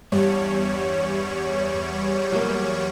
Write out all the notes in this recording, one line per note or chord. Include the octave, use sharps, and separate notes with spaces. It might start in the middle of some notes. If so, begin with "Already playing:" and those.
E2 G2 G3 C#5
F#3 A#3